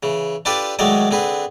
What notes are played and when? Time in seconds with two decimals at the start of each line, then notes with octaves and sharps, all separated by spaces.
0.03 C#3 E3
0.45 D4 F4 G4 A4 B4 D5
0.79 D#3 F#3 G#3 A3 D5 D#5
1.11 D3 C4 G#4 B4